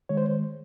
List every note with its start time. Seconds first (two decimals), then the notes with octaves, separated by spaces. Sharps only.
0.09 D#3 G#3 C#5
0.17 C5